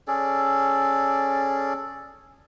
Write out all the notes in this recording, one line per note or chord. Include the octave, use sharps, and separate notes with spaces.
C#4 G#4 A4 D5